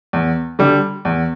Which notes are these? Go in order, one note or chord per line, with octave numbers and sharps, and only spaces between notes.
E2
D3 G3
E2